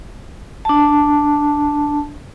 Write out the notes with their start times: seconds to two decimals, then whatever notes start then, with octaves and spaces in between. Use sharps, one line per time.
0.65 D4 A5